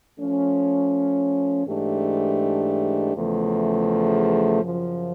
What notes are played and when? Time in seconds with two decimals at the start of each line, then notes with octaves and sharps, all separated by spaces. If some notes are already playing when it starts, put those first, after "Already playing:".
0.19 F3 A3 C#4
1.66 G#2 E3 A3 D4 G4
3.14 E2 C#3 F3 A3
4.61 F#2 C#3 F3